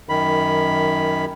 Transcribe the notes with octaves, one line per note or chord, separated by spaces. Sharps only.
F#2 D#3 B5